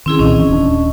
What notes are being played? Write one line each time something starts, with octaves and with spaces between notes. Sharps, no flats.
D#3 C4 C#4 E4 G#4
C2 A#2 D#3 C#4 D#5
E3
D#1 D4